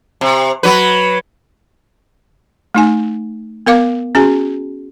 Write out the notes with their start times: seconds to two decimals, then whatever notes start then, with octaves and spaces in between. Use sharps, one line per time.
0.21 C3
0.63 F#3 B4
2.75 A3 D#4 G#5
3.66 B3 A#4 F5 D6
4.15 C#4 F#4 G#4 G#5